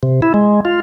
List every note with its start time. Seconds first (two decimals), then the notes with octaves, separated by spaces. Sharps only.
0.03 C3
0.22 E4
0.34 G#3
0.65 F4